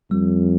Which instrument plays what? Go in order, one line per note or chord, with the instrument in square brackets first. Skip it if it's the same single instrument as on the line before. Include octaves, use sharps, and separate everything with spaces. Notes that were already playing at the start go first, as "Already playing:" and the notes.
[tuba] F2 [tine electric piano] G3